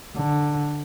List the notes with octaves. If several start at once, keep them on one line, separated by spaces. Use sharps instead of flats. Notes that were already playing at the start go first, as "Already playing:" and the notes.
D3